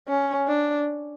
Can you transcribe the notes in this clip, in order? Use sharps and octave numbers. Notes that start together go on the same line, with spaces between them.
C#4
D4